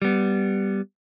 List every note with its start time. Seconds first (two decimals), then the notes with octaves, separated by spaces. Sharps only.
0.02 G3 B3